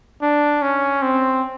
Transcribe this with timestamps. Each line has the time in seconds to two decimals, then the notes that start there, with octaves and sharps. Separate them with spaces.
0.22 D4
0.62 C#4
1.02 C4